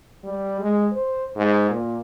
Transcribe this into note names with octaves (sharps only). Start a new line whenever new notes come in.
G3
G#3
C5
G#2
A#2